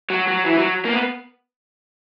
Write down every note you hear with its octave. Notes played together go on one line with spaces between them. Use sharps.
F#3
F#3
E3
F#3
A#3
B3